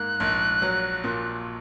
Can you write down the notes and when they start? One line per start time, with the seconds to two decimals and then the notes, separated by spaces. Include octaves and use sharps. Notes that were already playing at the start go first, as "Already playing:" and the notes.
Already playing: G#2 A#3 F#6
0.20 A#1
0.62 F#3
1.04 A#2